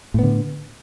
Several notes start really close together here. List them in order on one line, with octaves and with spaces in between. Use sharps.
A2 B3 D3